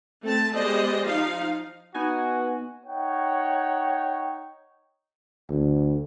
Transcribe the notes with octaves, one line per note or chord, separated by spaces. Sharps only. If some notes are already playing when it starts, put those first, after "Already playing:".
A3 C4 A5
G#3 B3 G4 C5 D5 D#5
F3 D#4 F5
B3 D#4 F#4 G#5
D#4 C#5 F#5 G5
D2